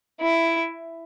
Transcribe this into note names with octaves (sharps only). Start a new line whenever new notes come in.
E4